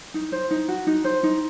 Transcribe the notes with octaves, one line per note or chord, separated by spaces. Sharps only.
D#4
C5
D#4
F#4
D#4
C5
D#4